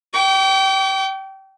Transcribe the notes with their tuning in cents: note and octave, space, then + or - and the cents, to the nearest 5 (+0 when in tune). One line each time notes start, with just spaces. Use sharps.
G5 -25 D6 -45